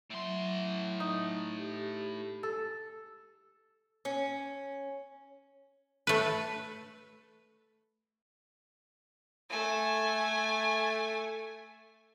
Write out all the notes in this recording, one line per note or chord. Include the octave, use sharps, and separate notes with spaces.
A2 F#3 E5 C6
D#4
G4
A4
C#4
A3 B4
A3 G#5